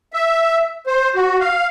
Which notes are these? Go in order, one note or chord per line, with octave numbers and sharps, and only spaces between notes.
E5
C5
F#4
F5